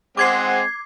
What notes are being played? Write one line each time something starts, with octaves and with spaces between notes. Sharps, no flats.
G#3 C4 G#4 C5 F#5 D6 G#6 C7